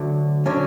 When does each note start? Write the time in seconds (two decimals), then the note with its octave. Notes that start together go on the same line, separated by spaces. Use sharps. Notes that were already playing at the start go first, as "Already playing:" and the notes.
Already playing: D2 D3 F#3
0.46 D3 F#3 C#4